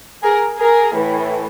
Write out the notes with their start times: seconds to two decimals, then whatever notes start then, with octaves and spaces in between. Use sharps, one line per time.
0.22 G#4 A#4
0.58 G#4 A#4
0.94 A2 E3